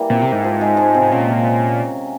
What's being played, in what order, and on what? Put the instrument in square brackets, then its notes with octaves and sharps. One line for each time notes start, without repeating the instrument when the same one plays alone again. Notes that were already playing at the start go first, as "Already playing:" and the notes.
Already playing: [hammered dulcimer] E3 G3 A#3
[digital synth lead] A#2 [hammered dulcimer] C4
[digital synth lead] C3
[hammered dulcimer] C4
[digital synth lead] G#2
[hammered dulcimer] F3
G#3
F3
C3
[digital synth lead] G#2
[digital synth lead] A#2 [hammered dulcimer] C#4
[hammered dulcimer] C3